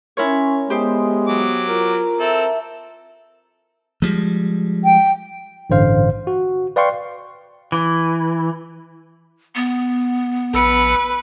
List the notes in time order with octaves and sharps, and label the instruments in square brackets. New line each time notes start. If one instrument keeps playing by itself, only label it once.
[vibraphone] C#4 G#5 C6 [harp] E4 A#4 C#5
[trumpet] G#3 [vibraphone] B3 D#6 [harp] G4 C5
[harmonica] F#3 D6
[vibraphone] F4 [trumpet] A#4
[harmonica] C4 A4 [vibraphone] E5 A5
[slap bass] F3 G3 G#3
[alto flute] G5
[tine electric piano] A1 G2 D3 C5 F5
F#4
B4 D5 F5 G5 C6 C#6
[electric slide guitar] E3
[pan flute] B3
[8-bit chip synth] A#1 E6 C#7 [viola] B4